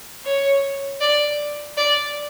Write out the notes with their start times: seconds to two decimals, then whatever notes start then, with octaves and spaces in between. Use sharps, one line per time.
0.25 C#5
1.01 D5
1.77 D5